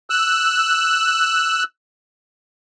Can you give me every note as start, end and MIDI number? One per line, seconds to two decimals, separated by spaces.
0.10 1.64 88
0.10 1.64 90